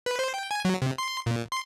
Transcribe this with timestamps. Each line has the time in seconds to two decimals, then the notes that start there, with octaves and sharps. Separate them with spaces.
0.06 B4
0.19 C5
0.34 G5
0.51 G#5
0.65 F#3
0.82 C3
0.98 C6
1.26 A#2
1.52 C6